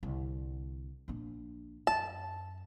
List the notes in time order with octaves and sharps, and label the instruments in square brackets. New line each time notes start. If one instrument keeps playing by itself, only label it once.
[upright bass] C2 D3
A#1 D4
[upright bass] F#2 [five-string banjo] A5